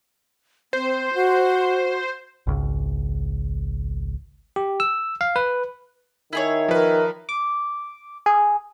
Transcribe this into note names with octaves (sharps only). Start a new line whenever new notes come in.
C4 C5
F#4
G#1 C#2
G4
E6
F5
B4
D#3 E4 G#4 C#5
F3 A#4 B4
D6
G#4